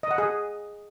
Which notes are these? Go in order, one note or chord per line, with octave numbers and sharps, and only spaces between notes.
D#5
F#5
G#4